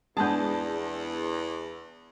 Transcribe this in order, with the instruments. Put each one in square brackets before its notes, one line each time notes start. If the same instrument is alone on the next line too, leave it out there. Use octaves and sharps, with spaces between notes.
[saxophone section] E2 [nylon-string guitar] G#3 D4 [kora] B3 G#4 [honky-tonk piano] A5 G6